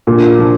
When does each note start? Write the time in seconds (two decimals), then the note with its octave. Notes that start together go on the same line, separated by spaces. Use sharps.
0.07 A#2 D4
0.28 F4
0.39 F3